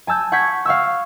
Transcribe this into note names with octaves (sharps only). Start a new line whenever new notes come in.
G#5 A5 E6 G6
F#5 C#6 G6 G#6 B6
F5 F#5 C#6 E6